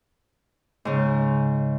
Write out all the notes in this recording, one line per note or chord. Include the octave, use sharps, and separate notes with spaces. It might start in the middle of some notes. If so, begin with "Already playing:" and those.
G#2 C#3